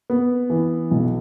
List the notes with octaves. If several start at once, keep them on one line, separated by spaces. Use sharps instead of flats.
B3
E3
B1